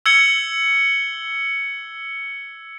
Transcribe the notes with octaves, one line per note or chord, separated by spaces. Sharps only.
E6 G#6 C#7 G7